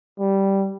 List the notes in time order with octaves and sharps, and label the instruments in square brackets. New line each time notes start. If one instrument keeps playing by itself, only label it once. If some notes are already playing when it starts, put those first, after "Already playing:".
[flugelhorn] G3